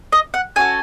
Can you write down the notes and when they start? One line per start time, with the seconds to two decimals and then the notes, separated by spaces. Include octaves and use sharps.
0.12 D#5
0.34 F#5
0.56 C#4 F#4 A4 G#5